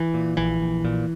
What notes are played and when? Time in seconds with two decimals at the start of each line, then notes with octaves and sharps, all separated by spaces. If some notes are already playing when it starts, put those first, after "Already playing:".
Already playing: E3
0.14 A#2
0.37 A#1 E3
0.60 A#1
0.85 A#2